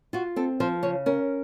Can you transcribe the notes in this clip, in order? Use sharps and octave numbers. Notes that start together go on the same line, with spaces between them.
F4 F#4
C4 A4
F3 C5
C#3 C#5
C#4 A#4